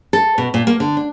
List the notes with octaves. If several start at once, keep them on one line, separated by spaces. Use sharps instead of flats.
A4
B2
A#2
A#3
D3
D4